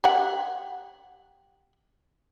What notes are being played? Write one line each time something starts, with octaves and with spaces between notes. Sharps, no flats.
G4 E5 F#5